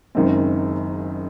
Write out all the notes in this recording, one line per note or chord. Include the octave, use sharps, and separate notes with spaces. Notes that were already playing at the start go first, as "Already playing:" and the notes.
F#1 F#2 D#3 G#3 C4